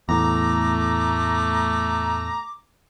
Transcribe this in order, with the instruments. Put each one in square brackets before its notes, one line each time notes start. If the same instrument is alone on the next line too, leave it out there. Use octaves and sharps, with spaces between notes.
[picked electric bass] E2 A2 [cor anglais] A3 [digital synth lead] A#5 [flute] D6